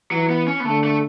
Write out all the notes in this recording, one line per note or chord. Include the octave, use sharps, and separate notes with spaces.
E3 F#3
B3
C#4
B3
D3 A3
A3